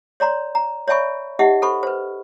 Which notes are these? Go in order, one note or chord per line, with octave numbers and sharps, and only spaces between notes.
C#5 D5 A#5 C6
A#5
C#5 D5 E5 G#5 B5 C#6
D#4 G4 D#5 E5 F#5
A4 C5 B5 C#6
B4 C5